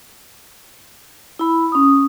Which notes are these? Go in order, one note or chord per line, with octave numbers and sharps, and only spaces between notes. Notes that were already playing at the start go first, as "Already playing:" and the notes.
E4 B5
C#4 D#6